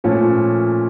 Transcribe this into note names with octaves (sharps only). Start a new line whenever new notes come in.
A#2 F3 A3 C#4